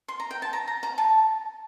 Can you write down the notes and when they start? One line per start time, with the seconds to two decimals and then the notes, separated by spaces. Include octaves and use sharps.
0.08 C6
0.20 A#5
0.31 G5
0.42 A5
0.53 A#5
0.68 A#5
0.83 A#5
0.98 A5